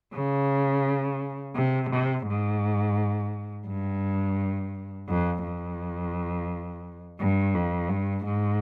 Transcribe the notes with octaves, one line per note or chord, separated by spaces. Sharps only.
C#3
C3
C3
G#2
G2
F2
F2
G2
F2
G2
G#2